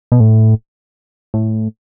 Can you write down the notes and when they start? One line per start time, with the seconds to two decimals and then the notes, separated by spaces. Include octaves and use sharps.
0.12 B2
0.20 A2
1.34 A2